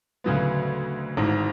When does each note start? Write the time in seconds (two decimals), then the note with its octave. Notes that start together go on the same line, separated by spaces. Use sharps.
0.24 D2 C#3 F#3 B3
1.17 G#1 G#2 E3